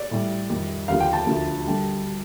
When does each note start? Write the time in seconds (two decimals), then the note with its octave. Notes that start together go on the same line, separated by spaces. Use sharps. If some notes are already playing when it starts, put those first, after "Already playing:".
Already playing: D5
0.11 A2 G3
0.50 F2 D#3 G3
0.88 D#2 D3 F3 F5
1.00 G5
1.13 A5
1.26 D2 D3 F3
1.67 D3 G3